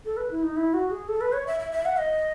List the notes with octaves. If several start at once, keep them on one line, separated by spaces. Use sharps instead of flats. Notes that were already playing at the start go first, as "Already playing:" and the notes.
A4
B4
E4
D#4
E4
F#4
G#4
A4
B4
C#5
E5
E5
E5
F#5
D#5